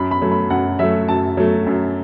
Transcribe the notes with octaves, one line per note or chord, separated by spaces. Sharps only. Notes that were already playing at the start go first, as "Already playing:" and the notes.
Already playing: F#2 B5
B5
F#3 A3
B5
F#2 F#5
F#3 A3 E5
F#2 A5
F#3 A3
F#2